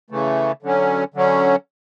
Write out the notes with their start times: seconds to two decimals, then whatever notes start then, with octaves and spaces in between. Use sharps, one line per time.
0.10 C#3 E3 A3
0.63 D3 F#3 C#4
1.14 D3 F#3 C#4